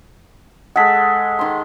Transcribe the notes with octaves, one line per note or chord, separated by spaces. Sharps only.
G#3 A4 F#5 B6
D#3 C6